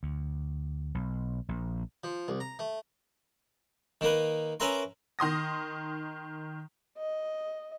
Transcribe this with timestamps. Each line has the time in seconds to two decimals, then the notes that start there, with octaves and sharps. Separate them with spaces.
0.03 D2
0.95 B1
1.49 A#1
2.04 F3
2.28 C2
2.40 A#5
2.59 A3
4.01 D#3 A#3 B4
4.60 C#4 A#4 B4 E5 A#5 C6
5.19 D#3 C6 D#6 A#6
6.98 D#5